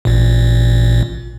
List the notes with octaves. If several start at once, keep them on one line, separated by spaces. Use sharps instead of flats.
A1 A#2